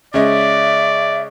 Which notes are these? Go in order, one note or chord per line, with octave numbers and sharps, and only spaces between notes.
C#3 G#3 C#4 D5 E5